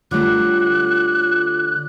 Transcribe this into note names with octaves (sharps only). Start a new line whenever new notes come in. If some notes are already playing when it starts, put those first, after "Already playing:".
D3 G3 A3 F4 C#5 D6 F#6